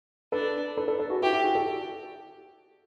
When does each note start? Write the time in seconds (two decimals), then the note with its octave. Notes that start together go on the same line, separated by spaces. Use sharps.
0.32 D4 A4 B4
0.77 A4 B4
0.88 A4 B4
0.99 A4 B4
1.10 F#4 G#4
1.22 E4 F#4 G4
1.33 E4 F#4
1.43 F#4 G#4
1.55 G4 A4